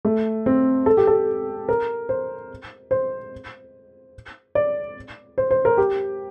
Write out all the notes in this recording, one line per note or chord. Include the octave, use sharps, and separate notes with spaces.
A3
C4
A4
G4
A4
A#4
C5
C5
D5
C5
C5
A#4
G4